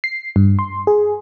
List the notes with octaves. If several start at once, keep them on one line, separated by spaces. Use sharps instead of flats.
C7
G2
C6
G#4